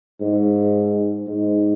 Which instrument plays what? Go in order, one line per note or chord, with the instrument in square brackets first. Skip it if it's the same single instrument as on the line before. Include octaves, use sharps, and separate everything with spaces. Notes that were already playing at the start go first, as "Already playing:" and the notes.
[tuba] G#2
G#2